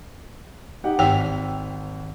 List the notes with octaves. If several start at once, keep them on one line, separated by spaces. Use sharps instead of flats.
D#4 G4 F#5
G#1 G5 E6 B6